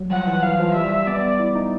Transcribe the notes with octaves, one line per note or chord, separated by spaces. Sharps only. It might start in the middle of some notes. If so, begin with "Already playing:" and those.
Already playing: F#3 G3
F3 F#5
E3
E3 F5
F3
G3 E5
B3 D5
E4
D#4